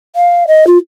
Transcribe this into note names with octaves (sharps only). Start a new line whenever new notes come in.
F5
D#5
F4